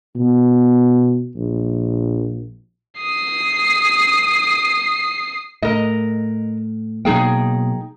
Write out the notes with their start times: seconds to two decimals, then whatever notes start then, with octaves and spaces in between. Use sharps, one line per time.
0.16 B2
1.36 A#1
3.00 D#6 C7
5.62 A2 A#4 D#5
7.05 B2 F#3 A#3 D#4 G#4 G5